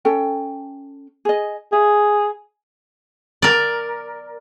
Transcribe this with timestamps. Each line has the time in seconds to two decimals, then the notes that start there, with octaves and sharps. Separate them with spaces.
0.05 C#4 A4 G5
1.25 G#4 D#5
1.72 G#4 E5
3.42 A#4 D5